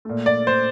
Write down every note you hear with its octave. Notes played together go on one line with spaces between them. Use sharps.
A#2 A3
D5
C5